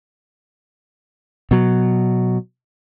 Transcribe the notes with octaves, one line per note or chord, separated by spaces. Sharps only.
B2 F#3